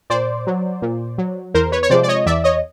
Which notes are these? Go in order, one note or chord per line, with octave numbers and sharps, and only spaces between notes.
A#2 C5 D5
F#3
A#2
F#3
E2 A#4 C5
B4 C#5
C#5
C3 F3 G#3 C5 D5
D5
C#5 D#5
E2 D5 E5
C#5 D#5